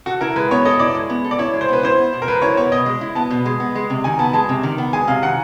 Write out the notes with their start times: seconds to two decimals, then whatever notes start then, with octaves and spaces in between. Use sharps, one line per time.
0.06 F#4 A4
0.21 E4 A#4
0.36 G#3 B4
0.51 B3 C#5
0.65 A4 D#5
0.79 E4 D5
0.95 G#3
1.10 B3
1.24 A4
1.31 D5
1.39 E4 C#5
1.53 G#3
1.61 C5
1.68 B3 B4
1.83 E4 C5
1.98 B3
2.13 B2
2.22 A#4
2.27 G#3 B4
2.42 E4 C#5
2.57 B3 C#5
2.72 B2 D#5
2.86 G#3
3.01 E4
3.15 B3 A5
3.30 B2
3.45 G#3
3.60 B3
3.75 G#3
3.90 C3
4.04 D#3 G#5
4.19 B3 A5
4.33 G#3 A5
4.49 C3
4.63 D#3
4.78 B3
4.93 G#3 G#5
5.07 C3 F5
5.22 D#3 F#5